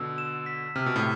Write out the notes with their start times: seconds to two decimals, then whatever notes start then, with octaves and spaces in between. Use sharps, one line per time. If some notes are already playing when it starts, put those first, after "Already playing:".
Already playing: B2 D3 E6
0.18 E7
0.46 B6
0.76 C3 F6
0.86 B2
0.96 A2 C3